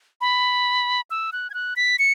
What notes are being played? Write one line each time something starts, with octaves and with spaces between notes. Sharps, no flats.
B5
E6
F#6
G#6
F#6
B6
C#7